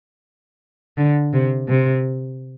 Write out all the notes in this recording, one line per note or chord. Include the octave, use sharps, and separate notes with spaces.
D3
C3
C3